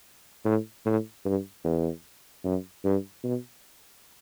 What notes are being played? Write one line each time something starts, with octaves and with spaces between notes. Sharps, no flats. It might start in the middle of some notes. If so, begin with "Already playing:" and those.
A2
A2
G2
E2
F#2
G2
B2